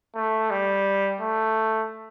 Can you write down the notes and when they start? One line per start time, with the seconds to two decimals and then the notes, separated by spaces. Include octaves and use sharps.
0.15 A3
0.51 G3
1.21 A3